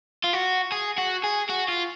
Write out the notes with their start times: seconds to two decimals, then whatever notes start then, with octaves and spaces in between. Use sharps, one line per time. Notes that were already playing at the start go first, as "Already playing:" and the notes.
0.24 F4
0.34 F#4
0.72 G#4
0.98 F#4
1.23 G#4
1.49 F#4
1.68 F4